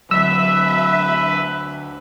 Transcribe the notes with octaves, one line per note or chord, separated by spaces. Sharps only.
D2 F#3 B4 E5 E6